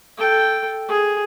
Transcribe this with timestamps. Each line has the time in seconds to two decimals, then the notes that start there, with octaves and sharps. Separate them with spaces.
0.18 A4 G5
0.89 G#4